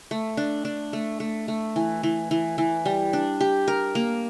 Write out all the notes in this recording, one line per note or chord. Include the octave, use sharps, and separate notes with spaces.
A3
D4
D4
A3
A3
A3
E3
E3
E3
E3
G3
D4
G4
A#4
A#3